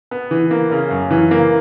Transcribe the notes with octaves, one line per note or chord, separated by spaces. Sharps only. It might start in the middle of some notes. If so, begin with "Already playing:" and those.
B3
E3
A#3
C#3
F#2
E3
A#3